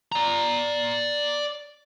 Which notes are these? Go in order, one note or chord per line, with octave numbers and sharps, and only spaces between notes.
D5 A#5